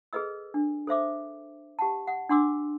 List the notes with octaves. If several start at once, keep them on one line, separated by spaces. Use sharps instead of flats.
G#4 A4 B4 D#5 E6
D4
A4 C5 E5 D6
G4 F#5 A5
F#5
D4 F#5 C6 D6 E6